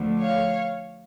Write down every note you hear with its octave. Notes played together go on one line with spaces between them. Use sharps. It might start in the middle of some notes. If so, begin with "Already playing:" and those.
Already playing: D2 D3 F3 A3
C#5 F5